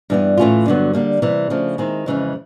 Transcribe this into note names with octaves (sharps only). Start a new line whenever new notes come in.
G2 E3 G3 B3
A2 E3 A3 C#4 F4
G2 D3 F#3 B3
D3 G3 A#3
C3 E3 G3
C#3 F3 A3 D4
D#3 G#3 C4 E4
F2 C#3 E3 G#3